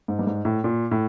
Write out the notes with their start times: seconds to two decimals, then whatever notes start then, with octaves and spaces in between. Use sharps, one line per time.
0.08 G#2
0.19 G2
0.27 G#2
0.45 A2
0.64 A#2
0.91 A2